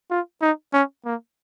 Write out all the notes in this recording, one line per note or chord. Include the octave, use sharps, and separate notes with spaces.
F4
D#4
C#4
A#3